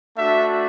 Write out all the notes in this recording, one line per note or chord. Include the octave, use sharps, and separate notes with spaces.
A3 D4 F#4 E5